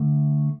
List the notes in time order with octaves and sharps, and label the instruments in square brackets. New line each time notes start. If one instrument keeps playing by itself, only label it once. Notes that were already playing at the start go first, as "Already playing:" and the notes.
Already playing: [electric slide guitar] D3 A3